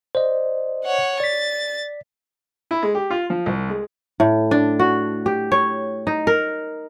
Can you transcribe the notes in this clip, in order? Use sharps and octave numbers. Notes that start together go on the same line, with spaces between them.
C5 D5 D#5
C#5 F#5
D5 A6 B6
E4
G#3
G4
F4
F3
C2
G#3
A2
D4
F#4
G4
C#5
D#4
A#4